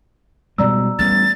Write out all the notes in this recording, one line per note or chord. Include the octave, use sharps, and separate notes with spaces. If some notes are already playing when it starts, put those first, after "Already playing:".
B2 G3 G#3 D5 A#5 E6
A1 G3 B3 A6